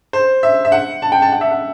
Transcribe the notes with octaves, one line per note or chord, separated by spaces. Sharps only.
C5
E5
E5
F#5
A5
G5
A5
F#5
E5
F#5